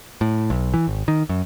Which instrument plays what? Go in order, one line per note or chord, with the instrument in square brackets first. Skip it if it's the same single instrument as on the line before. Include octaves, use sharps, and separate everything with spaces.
[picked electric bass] A2
B1
E3
G#1
D#3
F#2